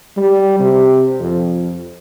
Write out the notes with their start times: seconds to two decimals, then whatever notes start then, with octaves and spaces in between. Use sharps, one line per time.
0.17 G3
0.59 C3
1.20 F2